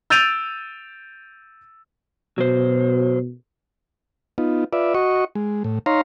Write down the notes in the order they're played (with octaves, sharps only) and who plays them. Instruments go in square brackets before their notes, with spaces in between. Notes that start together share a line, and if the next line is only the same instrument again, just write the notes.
[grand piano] E6 G6 A6 D7 D#7 F7
[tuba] B2 [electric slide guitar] F#3 C5
[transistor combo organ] B3 D#4 F4
F4 B4 D5 E5
F#4 D#5 C#6
G#3
A2
D#4 C#5 F5 A#5 C6